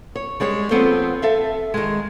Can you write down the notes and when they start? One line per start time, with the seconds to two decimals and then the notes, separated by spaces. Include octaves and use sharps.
0.16 C#5
0.40 G3 G#3 G#4 C#5
0.71 F3 B3 C4 A4 C5
1.22 A4 E5 F5
1.74 D#3 G#3